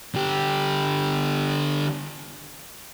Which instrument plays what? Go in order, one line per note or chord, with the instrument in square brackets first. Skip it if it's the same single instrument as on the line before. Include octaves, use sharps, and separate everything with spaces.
[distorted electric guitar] D3 G4